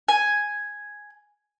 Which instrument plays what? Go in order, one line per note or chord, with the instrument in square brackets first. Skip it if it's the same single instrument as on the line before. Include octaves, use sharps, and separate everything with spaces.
[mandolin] G#5